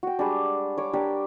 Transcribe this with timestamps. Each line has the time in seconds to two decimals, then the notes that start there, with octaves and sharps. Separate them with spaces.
0.03 F#4 G5
0.19 G3 G#3 D4
0.78 C#5 D6
0.93 D4 G4 A#4